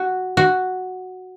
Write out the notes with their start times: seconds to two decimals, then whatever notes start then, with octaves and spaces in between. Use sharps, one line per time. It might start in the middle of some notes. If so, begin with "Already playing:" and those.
Already playing: F#4
0.37 F#4